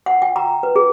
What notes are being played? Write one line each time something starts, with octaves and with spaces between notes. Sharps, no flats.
F#5
G5
A#5
B4
G#4